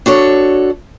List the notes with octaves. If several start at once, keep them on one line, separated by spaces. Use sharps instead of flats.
D4 F#4 A4 C#5